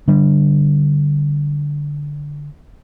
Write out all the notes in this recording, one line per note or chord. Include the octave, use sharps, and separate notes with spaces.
D3 G3 D4